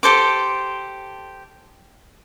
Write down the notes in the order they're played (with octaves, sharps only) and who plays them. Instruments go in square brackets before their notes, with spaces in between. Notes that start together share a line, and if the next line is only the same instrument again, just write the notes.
[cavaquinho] G4 A4 C5 D6